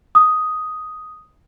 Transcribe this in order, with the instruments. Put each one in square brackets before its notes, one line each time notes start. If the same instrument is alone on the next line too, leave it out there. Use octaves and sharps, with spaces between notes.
[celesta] D#6